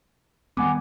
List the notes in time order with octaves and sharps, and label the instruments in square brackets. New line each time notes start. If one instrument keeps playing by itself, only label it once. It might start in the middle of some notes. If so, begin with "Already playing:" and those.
[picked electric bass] D#3 G3 B3 [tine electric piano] F#5 G#5 D6